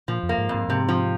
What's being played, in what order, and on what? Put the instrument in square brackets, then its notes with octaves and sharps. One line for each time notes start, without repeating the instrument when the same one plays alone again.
[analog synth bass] A#2 [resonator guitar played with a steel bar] F3
[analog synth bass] F2
[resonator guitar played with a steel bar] A#3
[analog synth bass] G#2
[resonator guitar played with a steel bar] F2
[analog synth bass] G#2
[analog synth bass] G#2 [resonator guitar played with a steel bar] C3
[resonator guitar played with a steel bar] F3